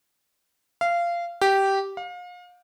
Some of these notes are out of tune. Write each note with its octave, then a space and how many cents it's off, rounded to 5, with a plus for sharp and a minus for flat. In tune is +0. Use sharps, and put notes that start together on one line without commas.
F5 -20
G4 -10
F5 +35